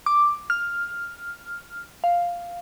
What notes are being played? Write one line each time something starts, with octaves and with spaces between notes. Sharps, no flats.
D6
F6
F5